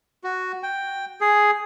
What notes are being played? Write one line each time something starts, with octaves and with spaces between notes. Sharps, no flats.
F#4
G5
G#4